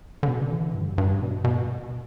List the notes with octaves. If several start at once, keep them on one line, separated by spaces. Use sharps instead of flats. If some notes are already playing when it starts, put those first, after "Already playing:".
D3
B2
D3
E3
G2
G2
B2
B2